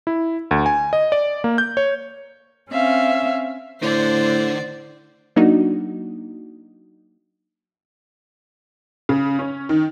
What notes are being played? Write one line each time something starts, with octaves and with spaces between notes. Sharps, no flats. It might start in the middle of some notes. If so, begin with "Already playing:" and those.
E4
D2
G#5
D#5
D5
A#3
G6
C#5
C4 C#4 E5 F5
A2 D3 C5 D5
F#3 A#3 D4 D#4 F#4
C#3
C#4
D#3